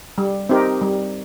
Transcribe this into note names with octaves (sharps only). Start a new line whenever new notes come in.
G3
C4 D#4 G4 A#4
G3